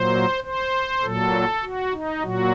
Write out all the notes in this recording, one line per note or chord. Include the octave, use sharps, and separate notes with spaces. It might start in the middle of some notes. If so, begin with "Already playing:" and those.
Already playing: A#2 F#3 C5
C5
A#2 F#3 A4
F#4
D#4
A#2 F#3 F#4